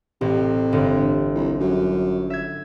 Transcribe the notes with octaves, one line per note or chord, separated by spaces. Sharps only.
A1 C3
G1
C2
F#2
E5 G#6